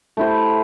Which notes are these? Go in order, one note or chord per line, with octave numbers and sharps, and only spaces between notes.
A3 E4 G4 C5